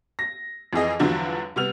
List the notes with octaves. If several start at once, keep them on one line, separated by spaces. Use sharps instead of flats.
A#6
F2 E3 G#4 D#5
E2 G2 D3 F3 F#3 D4
C3 G3 B3 F6 F7